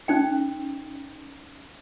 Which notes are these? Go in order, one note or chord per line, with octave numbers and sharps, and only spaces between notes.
C#4 D#4 G5